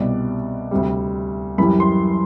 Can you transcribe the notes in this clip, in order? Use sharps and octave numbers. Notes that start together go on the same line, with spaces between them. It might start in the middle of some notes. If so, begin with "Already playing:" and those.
Already playing: C2 B2 G3 D5
D2 C3 G3
F#2 E3 G3 B5
C6